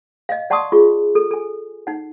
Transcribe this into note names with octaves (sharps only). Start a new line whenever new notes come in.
D#5 F5
D5 F#5 A5 C6 C#6 D#6
F4 G#4 C#6
A4
A4 G#5
D#4 F#5